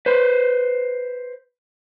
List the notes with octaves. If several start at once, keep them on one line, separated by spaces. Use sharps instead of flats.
B4 C5